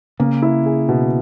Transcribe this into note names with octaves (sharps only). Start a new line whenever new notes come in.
C#3 A#3
E4
G#4
B2